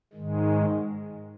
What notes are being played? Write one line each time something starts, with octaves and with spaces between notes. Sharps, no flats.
G#2 D#3 G#3